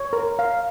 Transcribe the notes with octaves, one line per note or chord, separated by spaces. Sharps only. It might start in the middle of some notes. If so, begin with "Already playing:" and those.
Already playing: C#5
A#4
F5